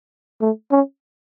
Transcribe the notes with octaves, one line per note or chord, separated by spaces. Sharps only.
A3
C#4